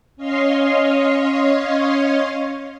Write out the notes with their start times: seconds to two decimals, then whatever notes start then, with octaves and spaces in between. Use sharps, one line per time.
0.16 C#4 C#5 D#5 F5 C6